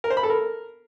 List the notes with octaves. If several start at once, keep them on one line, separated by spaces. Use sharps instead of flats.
A#4
C5
B5
A4
A#4